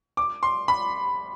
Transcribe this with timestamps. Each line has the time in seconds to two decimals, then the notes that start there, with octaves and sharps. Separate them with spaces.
0.17 D6
0.43 C6
0.68 B5